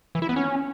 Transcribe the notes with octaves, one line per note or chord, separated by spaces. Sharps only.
E3
E4
B3
C#4